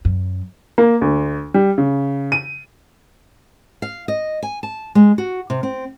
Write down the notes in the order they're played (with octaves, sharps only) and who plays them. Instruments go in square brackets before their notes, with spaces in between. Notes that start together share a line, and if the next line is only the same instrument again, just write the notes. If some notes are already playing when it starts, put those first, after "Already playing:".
[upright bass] F#2
[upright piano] A#3
D2
G3
C#3
D#7
[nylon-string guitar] F5
D#5
G#5
A5
G#3
F#4
C3
C4